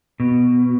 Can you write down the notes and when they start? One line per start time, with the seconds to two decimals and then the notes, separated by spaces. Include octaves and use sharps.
0.20 B2